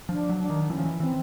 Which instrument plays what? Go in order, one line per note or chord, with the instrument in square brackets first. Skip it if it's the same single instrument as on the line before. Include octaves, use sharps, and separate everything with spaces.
[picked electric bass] F3 [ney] D4
[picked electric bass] F#3
[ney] D4
[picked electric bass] D#3
[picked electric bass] E3 [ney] C#4
[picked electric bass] F3
E3
[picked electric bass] E3 [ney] C4